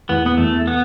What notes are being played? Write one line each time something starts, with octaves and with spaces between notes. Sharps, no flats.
E2 B3
B3
E2 A3
B3